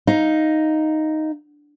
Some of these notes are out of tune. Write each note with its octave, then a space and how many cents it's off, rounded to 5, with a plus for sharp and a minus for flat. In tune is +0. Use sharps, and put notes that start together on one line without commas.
D#4 +0 F5 +0